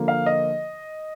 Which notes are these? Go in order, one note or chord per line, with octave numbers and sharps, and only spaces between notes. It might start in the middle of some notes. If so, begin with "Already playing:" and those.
Already playing: D3 F3 A#3
F5
D#5